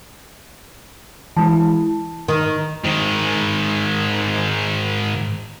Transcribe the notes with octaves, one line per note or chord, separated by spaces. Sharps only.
E3 G#3 E4 A5
D#3
G#2 D#3